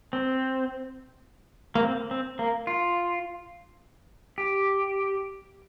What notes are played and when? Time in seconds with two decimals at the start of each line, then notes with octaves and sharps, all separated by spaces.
0.13 C4
1.75 A#3
1.83 C4
2.11 C4
2.39 A#3
2.67 F4
4.38 G4